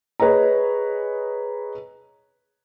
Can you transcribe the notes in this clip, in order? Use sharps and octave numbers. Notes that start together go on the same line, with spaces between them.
G#4 B4 C#5 D#5 A#5